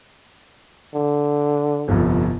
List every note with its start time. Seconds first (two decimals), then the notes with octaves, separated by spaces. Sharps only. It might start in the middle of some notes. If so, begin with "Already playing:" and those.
0.94 D3
1.88 G1 C2 F2